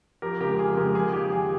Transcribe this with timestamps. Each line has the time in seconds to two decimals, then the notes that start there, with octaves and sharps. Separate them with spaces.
0.22 F2 G4 A#4
0.40 C#3 G#3 G4 A#4
0.59 F2 G#4
0.77 C#3 G#3 G4 A#4
0.95 F2 G#4
1.13 D#3 A#3 G4
1.32 F2 G#4